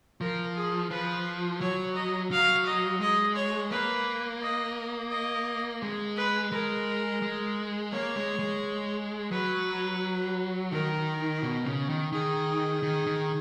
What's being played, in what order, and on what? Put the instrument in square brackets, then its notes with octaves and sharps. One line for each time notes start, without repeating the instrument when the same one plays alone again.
[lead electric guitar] F3 [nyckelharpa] A#4
[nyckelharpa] G#4
[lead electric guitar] F3 [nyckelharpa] B4
[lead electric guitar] F#3 [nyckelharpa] C#5
[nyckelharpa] D#5
[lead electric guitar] F#3 [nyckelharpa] F5
[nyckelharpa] D#5
[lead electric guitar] G#3 [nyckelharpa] D#5
[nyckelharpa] C#5
[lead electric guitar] A#3 [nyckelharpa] B4
[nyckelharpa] D#5
D#5
[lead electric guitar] G#3
[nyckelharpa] B4
[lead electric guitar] G#3 [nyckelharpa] A#4
[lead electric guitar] G#3
[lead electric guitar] A#3 [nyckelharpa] C#5
[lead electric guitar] G#3
G#3
[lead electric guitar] F#3 [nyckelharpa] B4
[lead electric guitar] D#3 [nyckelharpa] A#4
[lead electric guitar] B2
C#3
D#3
[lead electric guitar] D#3 [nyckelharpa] G#4
[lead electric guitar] D#3
D#3